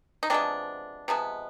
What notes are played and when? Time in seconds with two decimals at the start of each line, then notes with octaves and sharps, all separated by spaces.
0.23 D#4
0.30 C3 F3 G#3 B3 C4 D4
1.08 C3 F3 G#3 B3